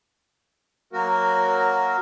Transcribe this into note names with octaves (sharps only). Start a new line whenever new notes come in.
F#3 A#3 F#4 A#4